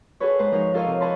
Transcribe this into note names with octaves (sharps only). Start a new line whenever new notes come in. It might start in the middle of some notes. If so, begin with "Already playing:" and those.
F#4 G#4 A4 B4 C#5
G#2 B4 C5
F3 G#3 D#4 A#4 C#5
F4 A4 A#4 C#5 D#5 F5
C3
B4 C#5 D#5 A5 B5 C6